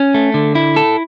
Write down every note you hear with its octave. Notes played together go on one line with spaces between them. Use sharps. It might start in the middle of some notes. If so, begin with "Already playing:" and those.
Already playing: C#4
A3
D3
E4
A4